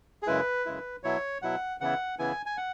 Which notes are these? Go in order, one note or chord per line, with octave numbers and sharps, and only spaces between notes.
G#4
F#2 C#3 G#3 E4 B4
F#2 C#3 G#3 E4
B2 F#3 E4 C#5
B2 F#3 E4 F#5
C#3 E3 B3 E4 F#5
C#3 E3 B3 E4 G#5
G#5
F#5